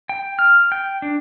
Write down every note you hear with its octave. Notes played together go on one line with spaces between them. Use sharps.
G5
F6
G5
D4